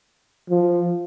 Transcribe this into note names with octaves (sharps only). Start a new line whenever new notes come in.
F3